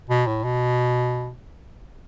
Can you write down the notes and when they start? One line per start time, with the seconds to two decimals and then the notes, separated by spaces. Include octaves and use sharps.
0.10 B2
0.27 A2
0.44 B2